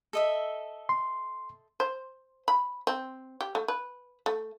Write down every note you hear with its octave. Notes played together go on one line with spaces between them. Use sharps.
A4 D#5 E5
C6
C5
B5
C4
G4
A3
B4
A3